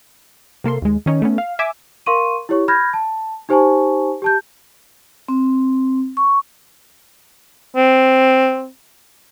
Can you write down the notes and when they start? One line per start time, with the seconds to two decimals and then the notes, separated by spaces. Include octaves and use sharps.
0.64 C3 A#3 A4 C6
0.82 D#2 G#3
1.06 D#3 C#4 D#4
1.22 A3 B3 C#4
1.38 F5
1.59 E5 G#5 D6
2.06 A#4 F5 C6 C#6 D#7
2.49 E4 G4 C#5 C#6
2.68 B5 F6 G6 G#6 A#6
2.94 A5
3.49 D#4 G4 C5 G#5 A5 C#6
4.22 G4 A5 G6
5.28 C4
6.17 C#6
7.76 C4